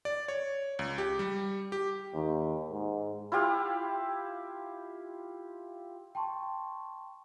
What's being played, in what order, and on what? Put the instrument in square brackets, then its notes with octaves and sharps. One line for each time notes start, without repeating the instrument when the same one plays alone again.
[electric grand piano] D5
C#5
C#2
G4
G3
G4
[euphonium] D#2
G#2
[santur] E4 F4 G4 F5
[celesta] G5 A5 C6 C#6